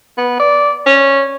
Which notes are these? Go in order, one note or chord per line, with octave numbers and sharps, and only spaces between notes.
B3
D5
C#4